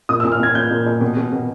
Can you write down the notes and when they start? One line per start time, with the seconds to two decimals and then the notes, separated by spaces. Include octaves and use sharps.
0.09 A#2 D#6
0.20 E6
0.24 A#2
0.32 F6
0.40 A#2 G#6
0.55 A#2 G6
0.71 A#2
0.86 A#2
1.01 B2
1.17 B2
1.32 B2